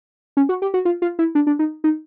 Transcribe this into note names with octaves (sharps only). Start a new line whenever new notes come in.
C#4
F#4
G4
F#4
F4
F4
E4
D4
D4
D#4
D#4